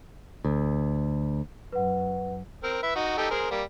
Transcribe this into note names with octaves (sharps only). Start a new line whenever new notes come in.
D2
F#2 B4 F#5
C4 A#4
B4 E5
D#4 F#4
D#4 G4 A4
G#4 A#4 C5
G3 A#3